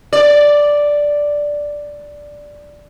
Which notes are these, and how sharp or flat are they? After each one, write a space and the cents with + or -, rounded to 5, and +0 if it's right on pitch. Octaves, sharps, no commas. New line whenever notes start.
D5 +0